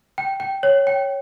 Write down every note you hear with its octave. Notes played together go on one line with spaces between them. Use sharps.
G5
G5
C#5
G5